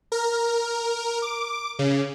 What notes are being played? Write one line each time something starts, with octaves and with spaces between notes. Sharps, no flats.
A#4
D6
C#3